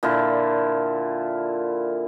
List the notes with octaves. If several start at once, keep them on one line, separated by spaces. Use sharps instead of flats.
A#2 D3 E4 F4